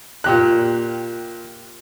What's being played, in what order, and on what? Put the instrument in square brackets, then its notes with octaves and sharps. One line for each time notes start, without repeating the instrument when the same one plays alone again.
[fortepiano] A#2 G4 F#6